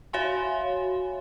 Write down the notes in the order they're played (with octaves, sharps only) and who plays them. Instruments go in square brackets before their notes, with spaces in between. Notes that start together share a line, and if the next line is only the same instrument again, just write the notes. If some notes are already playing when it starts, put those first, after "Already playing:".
[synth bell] F#4 C#5 E5 F5 G#5 C6